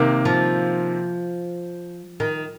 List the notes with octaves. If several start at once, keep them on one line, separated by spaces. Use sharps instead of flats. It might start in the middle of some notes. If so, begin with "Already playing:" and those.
Already playing: C3 D#3 A#3
F3
D#3